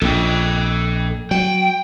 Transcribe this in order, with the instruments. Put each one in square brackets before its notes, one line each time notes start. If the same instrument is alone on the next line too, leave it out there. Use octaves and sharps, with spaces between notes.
[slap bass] A#1 [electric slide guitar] A4 D#5 G5
[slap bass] F#3 [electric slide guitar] G5